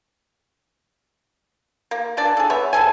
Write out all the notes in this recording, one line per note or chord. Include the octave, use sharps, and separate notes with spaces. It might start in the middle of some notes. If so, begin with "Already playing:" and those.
A#3
E3 A#3 D4 D5
G#4 A4
B3 C#5 E5
C3 G#4 A4 G#5